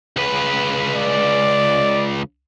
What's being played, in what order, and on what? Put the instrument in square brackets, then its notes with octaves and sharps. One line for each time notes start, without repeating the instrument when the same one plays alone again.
[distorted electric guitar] C#2 B4
[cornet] D5